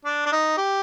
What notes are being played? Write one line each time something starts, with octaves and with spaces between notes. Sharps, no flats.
D4
D4
D#4
G4